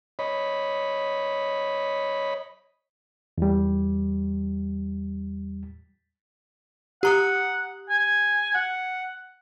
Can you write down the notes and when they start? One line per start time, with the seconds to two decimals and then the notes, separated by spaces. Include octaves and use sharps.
0.19 C#5 D#5 B5
3.38 E2 G3
7.03 G4 F#5 A#5 D#6
7.90 G#5
8.55 F#5